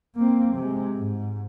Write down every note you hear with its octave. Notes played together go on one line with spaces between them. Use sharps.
A#3 C4
C3 G#3
G#2